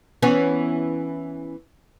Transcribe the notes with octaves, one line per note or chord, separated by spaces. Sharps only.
E3 B3 C#4